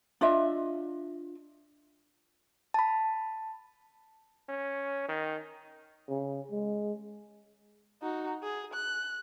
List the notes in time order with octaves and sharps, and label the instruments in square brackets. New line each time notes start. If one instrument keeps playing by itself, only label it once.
[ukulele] D4 F4 D#5 E5
[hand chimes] A5 B5
[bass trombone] C#4
D#3
[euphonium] C#3
G#3
[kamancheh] D#4 F#4
G#4
F#6